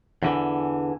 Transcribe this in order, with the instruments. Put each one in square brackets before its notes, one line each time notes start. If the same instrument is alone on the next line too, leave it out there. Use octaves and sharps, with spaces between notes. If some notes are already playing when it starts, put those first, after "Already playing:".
[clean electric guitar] E2 D3 E3